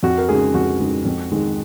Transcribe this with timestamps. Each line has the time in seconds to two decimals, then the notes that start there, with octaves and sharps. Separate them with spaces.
0.03 F2 F#4
0.18 A#4
0.29 C#3 G#3 D#4 G#4
0.54 F2 F#4
0.80 C#3 G#3 D#4
1.05 F2
1.31 D#3 G#3 D#4